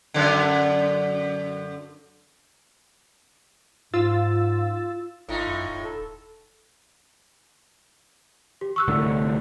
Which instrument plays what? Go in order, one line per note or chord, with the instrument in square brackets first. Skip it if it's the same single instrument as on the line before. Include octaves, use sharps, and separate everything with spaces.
[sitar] F#2 D3
[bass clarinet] G#2 [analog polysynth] F4 E6 A6
[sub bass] G#1 [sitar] A2 D#4 [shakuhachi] F4
[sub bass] F#2
D#1
[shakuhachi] A4
[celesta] G4
C#6 E6 F#6
[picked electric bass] C2 A2 D3